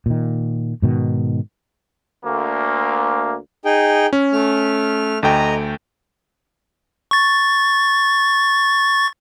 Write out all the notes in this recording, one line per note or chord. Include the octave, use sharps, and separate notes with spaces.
A#2 D#3
G#2 B2 D#3
D2 A#3
D#4 G#4 G5
C#4
A3 F6
D2 A3 D#5 G5 A#5
C#6 A6